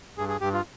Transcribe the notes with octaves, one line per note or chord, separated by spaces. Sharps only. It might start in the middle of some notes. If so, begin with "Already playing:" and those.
G2 G#4
G#4
G2 G4
F4